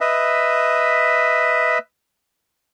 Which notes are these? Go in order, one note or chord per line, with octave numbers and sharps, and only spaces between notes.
B4 D#5 E5